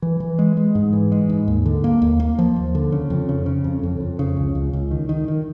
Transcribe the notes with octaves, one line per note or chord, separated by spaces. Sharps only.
E3
E3
G#3
G#3
G#2
E3
G#3
G#2
D#2
D3
A#3
D#2
A#3
F3
D#2
D3
C#3
F2
C#3
C#3
F2
F2
F2
C#3
C#2
C#2
C#2
D#3
D#3
D#3